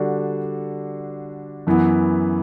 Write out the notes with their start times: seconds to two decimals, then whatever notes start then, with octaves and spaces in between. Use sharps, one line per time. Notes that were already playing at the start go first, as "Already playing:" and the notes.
Already playing: D3 G3 D4 F#4
1.67 F#2 E3 B3